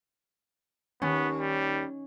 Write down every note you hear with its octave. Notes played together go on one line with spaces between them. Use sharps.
D#2 B3 C#4
G3